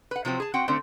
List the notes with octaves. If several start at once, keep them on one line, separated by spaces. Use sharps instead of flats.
B4 F#5
C3 F3 F#3 C4
G#4 A5
C4 F#4 F#5 G5
D3 A3 C4